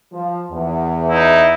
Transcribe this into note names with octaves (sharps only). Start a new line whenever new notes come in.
F3
E2
D#4 E4